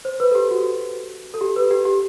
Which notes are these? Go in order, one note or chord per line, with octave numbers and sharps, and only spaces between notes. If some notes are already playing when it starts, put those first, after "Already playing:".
C5
B4
A4
G4
F#4
A4
G4
B4
G4
G4